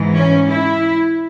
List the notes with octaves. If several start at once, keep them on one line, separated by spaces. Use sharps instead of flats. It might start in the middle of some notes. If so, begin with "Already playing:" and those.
Already playing: G#2 E3
C#4
E4